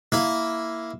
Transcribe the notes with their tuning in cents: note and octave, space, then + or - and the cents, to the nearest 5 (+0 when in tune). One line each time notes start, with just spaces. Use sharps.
A#3 +0 E4 +0